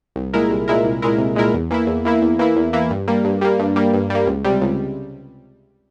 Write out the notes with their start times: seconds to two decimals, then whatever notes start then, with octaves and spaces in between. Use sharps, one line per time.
0.16 C2
0.34 A#2 G#3 E4 A#4
0.50 C2
0.68 A#2 G#3 E4 A#4
0.84 C2
1.02 A#2 G#3 E4 A#4
1.18 C2
1.36 A#2 G#3 E4 A#4
1.53 E2
1.71 E3 A#3 E4
1.87 E2
2.05 E3 A#3 E4
2.22 E2
2.39 E3 A#3 E4
2.56 E2
2.73 E3 A#3 E4
2.90 G2
3.07 G3 A#3
3.25 G2
3.41 G3 A#3
3.59 G2
3.76 G3 A#3
3.94 G2
4.10 G3 A#3
4.27 C#2
4.44 C3 G3
4.61 C#2